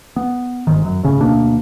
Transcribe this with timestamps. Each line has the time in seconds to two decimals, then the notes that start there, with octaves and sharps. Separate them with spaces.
0.16 B3
0.67 G1 G#2 D#3
0.85 F#2
1.03 G1 A2 C#3 C#4
1.20 D2 B2 A#3 D4